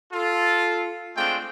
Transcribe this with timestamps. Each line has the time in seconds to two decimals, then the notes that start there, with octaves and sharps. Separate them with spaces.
0.13 F4 A4
1.16 G#3 A3 C4 D4 F4 G5